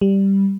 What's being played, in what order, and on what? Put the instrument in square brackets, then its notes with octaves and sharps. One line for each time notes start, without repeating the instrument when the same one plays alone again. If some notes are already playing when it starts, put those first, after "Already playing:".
[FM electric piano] G3